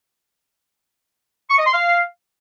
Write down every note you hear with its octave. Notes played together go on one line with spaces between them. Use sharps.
C#6
D#5
C6
F5